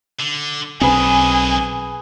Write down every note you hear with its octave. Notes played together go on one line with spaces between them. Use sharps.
D3
B1 D#3 C4 D4 G#4 B4 G#5